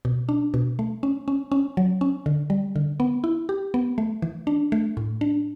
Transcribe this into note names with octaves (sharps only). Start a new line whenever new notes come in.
B2
D4
B2
A3
C#4
C#4
C#4
F#3
C#4
D3
G3
D3
B3
E4
G4
B3
A3
E3
D4
A3
A2
D4